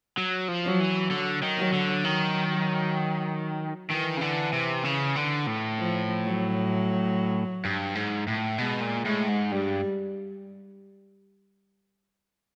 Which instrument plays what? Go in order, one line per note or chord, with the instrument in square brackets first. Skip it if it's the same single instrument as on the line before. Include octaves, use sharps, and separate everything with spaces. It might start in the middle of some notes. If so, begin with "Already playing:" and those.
[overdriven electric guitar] F#3
F3
[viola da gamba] F#3
[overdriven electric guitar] E3
[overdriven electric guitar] D3 [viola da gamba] F#3
[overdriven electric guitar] D#3
[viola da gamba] F#3
[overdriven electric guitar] D3
[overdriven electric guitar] D#3 [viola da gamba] F#3
[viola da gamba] F#3
[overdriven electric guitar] D#3 [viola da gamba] E3
[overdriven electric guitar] C#3
D3
C3
C#3
D3
A2
[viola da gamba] F3
F#3
[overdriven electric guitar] G2
G#2
A2
[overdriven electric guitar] B2 [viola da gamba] G#3
[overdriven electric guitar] A#2
[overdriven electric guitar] A2 [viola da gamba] G#3
[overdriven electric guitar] G#2
[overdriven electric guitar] G2 [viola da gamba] G3